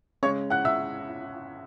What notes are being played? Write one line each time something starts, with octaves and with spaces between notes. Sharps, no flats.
C#3 G#3 C#4 C#5 C#6
F#5 F#6
E5 E6